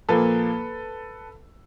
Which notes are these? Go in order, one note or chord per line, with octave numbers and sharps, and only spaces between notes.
A#2 F3 A#3 A4 B4